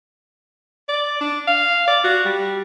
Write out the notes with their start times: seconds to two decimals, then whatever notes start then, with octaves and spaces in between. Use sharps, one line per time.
0.89 D5
1.21 D4
1.48 F5
1.88 D5
2.04 F#4
2.25 G3